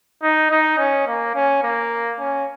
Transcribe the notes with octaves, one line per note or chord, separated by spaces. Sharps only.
D#4
D#4
C#4
A#3
C#4
A#3
C#4